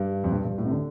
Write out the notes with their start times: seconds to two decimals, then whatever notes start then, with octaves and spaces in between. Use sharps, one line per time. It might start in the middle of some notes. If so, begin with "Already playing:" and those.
Already playing: G2
0.24 F2
0.32 G2
0.45 G2
0.58 A2
0.65 C3
0.71 D3